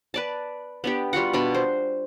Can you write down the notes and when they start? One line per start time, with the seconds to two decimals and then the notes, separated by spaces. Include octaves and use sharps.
0.14 B4 D5 A5
0.84 B3 D4 G4
1.13 G3 F4 F#4 F#5
1.33 B2 D4 B5
1.54 C5